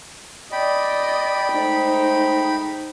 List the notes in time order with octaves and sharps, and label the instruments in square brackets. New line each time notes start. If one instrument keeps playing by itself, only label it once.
[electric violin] D5 D#5 [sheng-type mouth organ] G5 B5
[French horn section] G#3 A3 C5 [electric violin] D#4